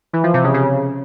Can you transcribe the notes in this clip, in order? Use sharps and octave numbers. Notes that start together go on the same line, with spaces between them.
E3
F3
C3
C#3
C#3